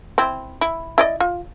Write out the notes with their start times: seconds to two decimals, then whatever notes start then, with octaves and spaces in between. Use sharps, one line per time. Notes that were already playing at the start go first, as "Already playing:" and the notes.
0.18 C4 E4
0.61 E4
0.98 E4 D5 D#5
1.20 F4